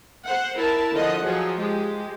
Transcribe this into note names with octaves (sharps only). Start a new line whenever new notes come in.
C5 F#5
E4 A#4 A5
D3 F3 D#5 F#5
F3 F#3 G#4
G#3 G4